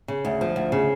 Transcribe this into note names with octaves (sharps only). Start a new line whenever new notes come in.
C#3
D2
F3
D2
C#3